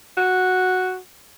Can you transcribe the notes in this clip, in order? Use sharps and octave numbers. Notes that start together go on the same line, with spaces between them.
F#4